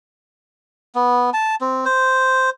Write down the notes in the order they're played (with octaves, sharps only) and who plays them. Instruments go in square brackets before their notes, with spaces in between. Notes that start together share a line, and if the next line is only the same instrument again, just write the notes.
[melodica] B3
A5
C4
C5